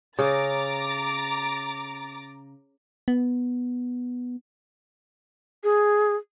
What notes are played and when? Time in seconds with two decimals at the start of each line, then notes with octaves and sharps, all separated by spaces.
0.19 C#3 A#5 D6 A6
3.08 B3
5.64 G#4